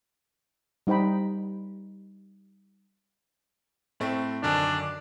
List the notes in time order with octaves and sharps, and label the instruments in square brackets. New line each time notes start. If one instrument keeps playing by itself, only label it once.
[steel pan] G3 D#4 C5 G5 B5
[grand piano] A2 A3 C4
[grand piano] F#2 D3 D#3 [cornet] D4